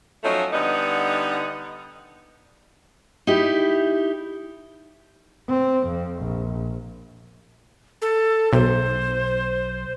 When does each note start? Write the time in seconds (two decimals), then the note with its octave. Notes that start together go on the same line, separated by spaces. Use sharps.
0.23 F3 F#3 A3 C#4 D#4
0.53 D3 G3 B3 D#4
3.27 D#4 E4 G4
5.49 C4
5.87 F2
6.22 A#1
8.02 A4
8.53 B1 C5